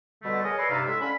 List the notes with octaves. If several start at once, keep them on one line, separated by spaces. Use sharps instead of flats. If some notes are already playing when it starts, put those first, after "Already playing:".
B2 D3 G3 A3
G#4 A#4 C#5 D#5
B4 C#5 D5 E5 A#5 C6
G2 C3 D#4 A4 B4 F5
A2 G#3 A4 E5
D3 C#4 F5 B5